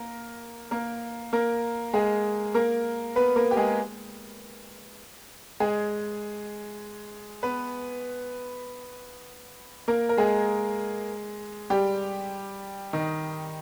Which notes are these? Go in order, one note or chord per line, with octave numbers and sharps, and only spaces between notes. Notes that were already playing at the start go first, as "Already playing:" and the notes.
Already playing: A#3 A#4
A#3 A#4
A#3 A#4
G#3 G#4
A#3 A#4
B3 B4
A#3 A#4
G4
G#3 G#4
G#3 G#4
B3 B4
A#3 A#4
A#4
G#3 G#4
G3 G4
D#3 D#4